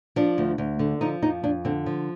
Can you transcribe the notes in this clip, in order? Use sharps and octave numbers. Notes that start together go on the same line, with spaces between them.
F3 D4
D2
D2
D3
F3 D#4
F2 D#4
F2 D4
D3 C4
F3